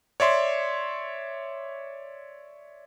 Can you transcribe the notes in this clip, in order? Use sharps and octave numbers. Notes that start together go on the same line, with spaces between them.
C#5 D5 E5 C6